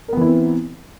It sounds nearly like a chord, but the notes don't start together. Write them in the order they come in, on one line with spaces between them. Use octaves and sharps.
A#4 B3 E3 E4 C4